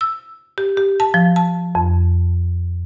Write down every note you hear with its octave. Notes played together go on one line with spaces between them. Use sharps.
E6
G4
G4
A5
F3
A5
F2